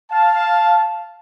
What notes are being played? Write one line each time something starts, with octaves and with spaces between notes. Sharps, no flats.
F5 A5